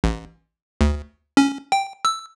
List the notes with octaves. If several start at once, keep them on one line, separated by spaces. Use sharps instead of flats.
A1
D2
C#4
G5
E6